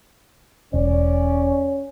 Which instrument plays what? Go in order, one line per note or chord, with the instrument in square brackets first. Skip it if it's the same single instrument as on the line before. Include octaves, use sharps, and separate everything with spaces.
[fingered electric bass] E1 [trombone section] C#4 [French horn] D5